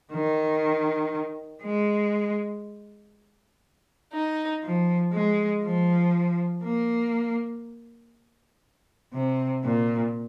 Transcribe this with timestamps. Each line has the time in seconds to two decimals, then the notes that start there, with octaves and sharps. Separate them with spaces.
0.12 D#3
1.62 G#3
4.13 D#4
4.62 F3
5.12 G#3
5.64 F3
6.63 A#3
9.14 C3
9.64 A#2